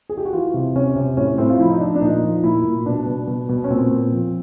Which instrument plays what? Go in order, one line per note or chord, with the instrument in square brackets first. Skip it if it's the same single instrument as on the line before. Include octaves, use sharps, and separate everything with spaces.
[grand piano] G#4
G4
F#4
E3 F4
C3
C3 C#4
C3
A2 C#4
A2 C4
F4
F3 E4
D#4
F3 D4
D4
A#2 D#4
F3
A#2 E4
A#2
B2 D4
B2
B2
B2
C#4
A#2 C4
A#2
F3